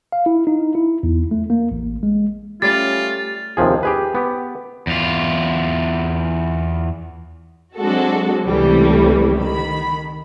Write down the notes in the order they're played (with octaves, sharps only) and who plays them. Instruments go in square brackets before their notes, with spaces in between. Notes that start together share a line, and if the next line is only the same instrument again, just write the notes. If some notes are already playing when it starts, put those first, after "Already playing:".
[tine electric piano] F5
E4
D#4
E4
E2
A3
A#3
A1
G#3
[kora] G3 [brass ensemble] A3 C#4 [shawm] F4 [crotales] A6
[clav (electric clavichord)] D#2 C3 F3 G#4
G4 G#4 B4
B3 G4
[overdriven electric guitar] E2 F4
[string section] F#3 G#3 C4 D4 F#4 A4
C#2 C3 E3 G3 A3
D#3 B5